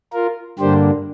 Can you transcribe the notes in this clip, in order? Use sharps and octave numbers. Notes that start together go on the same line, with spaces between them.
F4 A#4
G2 D3 G3 A#3 D4 G4 C5